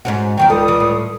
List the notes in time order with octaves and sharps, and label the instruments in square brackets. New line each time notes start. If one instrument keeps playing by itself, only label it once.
[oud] G#2 C#4 F#4
[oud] E2 D#3 F#3 [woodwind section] G5
[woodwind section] C#2 G3 D#6 [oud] A4
[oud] E3
A2